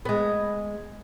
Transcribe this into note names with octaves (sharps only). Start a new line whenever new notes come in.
G#3 B3